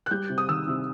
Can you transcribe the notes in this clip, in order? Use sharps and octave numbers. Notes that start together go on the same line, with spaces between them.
F#6
G3 G6
C3
D#6
D#3 E6
C3